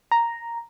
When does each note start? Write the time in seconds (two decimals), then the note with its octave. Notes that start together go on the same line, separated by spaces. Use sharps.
0.12 A#5